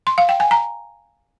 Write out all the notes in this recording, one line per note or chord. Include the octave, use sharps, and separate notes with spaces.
C6
F5
G5
G#5
A#5